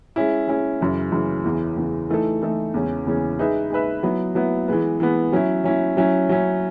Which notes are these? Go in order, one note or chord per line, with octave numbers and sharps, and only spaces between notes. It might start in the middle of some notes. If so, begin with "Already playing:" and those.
G#3 C#4 E4
G#3 C#4 E4
F#2 C#3 E3
F#2 C#3 E3
E2 C#3 E3
E2 C#3 E3
E3 A3 D#4 A4
E3 A3 D#4 A4
E2 C#3 E3 G#3 C#4
E2 C#3 E3 G#3 C#4
G#3 D#4 G#4 B4 E5
G#3 D#4 G#4 B4 E5
F#3 B3 E4
F#3 B3 E4
E3 G#3 B3
E3 G#3 B3
F#3 C#4 E4
F#3 C#4 E4
F#3 C#4 E4
F#3 C#4 E4